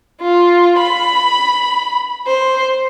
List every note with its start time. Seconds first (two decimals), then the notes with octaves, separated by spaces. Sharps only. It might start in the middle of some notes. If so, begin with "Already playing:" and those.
0.21 F4
0.78 B5
2.27 C5